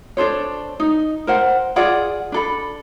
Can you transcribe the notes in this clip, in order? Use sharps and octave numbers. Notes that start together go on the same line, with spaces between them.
D4 A4 C5 C#5
D#4
A#4 C5 F#5
F4 G#4 D5 F#5
D4 A4 B5